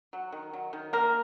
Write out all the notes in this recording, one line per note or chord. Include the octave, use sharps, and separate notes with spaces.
F#3
D#3
F#3
D#3
A#3 A#4